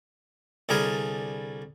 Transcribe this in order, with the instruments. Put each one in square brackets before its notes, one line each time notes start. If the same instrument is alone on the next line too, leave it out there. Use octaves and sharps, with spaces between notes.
[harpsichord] C2 D3 G3 G#4 A#4 G#5